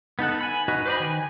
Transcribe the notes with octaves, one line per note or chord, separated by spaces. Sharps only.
B3 D#4 A4 F#5
G#5 B5
D#4 F#4 B4 D#5
B4 C5 D5 D#5 B5
D#3 G#5